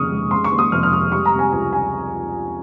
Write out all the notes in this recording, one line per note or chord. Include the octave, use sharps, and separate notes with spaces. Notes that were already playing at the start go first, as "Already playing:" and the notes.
Already playing: F1 D#2 C#3 C#6 D#6 F6
G#3
C#3 C6
C#6
D#2
D#6
F1 F6
F6
G#3 D#6
G3 C#6
A#5
C3
G#5
C#2 G#5
G#5